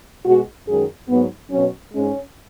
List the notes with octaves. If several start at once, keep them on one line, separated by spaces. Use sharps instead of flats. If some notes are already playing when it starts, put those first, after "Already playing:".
B2 G#3 F#4
F#2 D#3 G#3 G#4
G#2 F#3 B3
B2 F#3 C#4
G#2 G#3 C#4